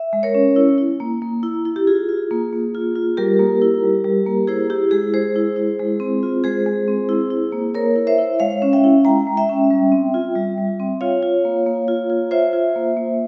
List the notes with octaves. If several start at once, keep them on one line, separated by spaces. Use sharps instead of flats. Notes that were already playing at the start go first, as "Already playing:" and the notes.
Already playing: E5
G#3
A#4 C#5
C#4
E4
E4
A#3
A#3
E4
E4
G4
F4 G#4
F4
A#3
A#3
F4
F4
G3 G4 A#4
A#3
E4
G3
G3
A#3
E4 G#4 C5
E4 G4
G#3 G#4
G#3 G#4 C5
E4
E4
G#3
C4
F4
G#3 G#4 C5
G#3
C4
E4
E4
A#3
A#3 A#4 C#5
E4
C5 E5
E4
G#3 C#5 F5
C#4
E5 G5
E4
G#3 G5 A#5
G#3
E5 G5
C#4
G3
C4
F4
G3
G3
C4
F4 C#5 F5
F4
A#3
A#3
F4
F4
F4 C5 E5
F4
A#3
A#3